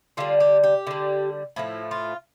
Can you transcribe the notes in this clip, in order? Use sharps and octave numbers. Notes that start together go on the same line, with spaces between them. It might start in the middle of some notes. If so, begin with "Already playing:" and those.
D3 G3 F4
G4
G4
D3 G3
A2 F3 A3 E4
F4